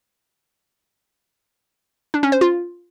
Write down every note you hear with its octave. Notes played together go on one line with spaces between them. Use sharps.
D4
C#4
C5
F4